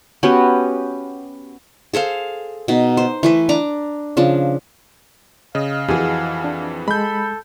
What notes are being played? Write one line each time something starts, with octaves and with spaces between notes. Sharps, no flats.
B3 C#4 F#4 G4
G#4 A4 C5 F5
B2 D#4
C5
E3 A3 B4
D4 A#5 D6
C#3 F3 D4
C#3 D#5 F5
F2 E3 F#4 G#4
D4
G#3 A4 B5 G6